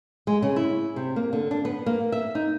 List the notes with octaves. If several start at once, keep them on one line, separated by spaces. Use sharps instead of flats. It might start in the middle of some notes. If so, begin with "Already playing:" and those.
G#3
C#3
E4
C3
A#3
D3
D4
B3
A#3
E5
D#4